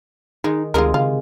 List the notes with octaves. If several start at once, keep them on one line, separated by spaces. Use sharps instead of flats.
D#3 G#3 D#4
D2 C3 D#3 G#3 F4 A#4
C#3 F4